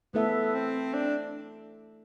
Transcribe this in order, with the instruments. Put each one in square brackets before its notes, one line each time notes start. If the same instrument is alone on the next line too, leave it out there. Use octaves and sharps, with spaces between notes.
[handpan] A3 E4 A4 E5 [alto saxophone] B3
[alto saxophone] C4
D4